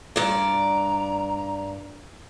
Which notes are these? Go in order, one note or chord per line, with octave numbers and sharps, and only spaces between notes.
G2 D5 A#5